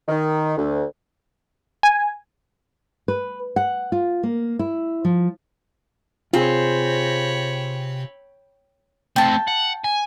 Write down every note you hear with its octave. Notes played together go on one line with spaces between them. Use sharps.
D#3
D2
G#5
B4
F#5
F4
A#3
E4
F3
C3 C4 F4 G#4 C#5 B5
A3 C4 G5 A5
F#5
G#5